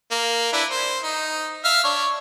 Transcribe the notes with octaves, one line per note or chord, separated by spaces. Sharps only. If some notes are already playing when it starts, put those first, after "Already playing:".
A#3
D4 E4 B4
C5
D#4
E5 F5 F6
D4 C#5